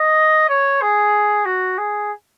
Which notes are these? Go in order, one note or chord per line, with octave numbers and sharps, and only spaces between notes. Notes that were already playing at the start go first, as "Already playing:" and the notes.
Already playing: D#5
C#5
G#4
F#4
G#4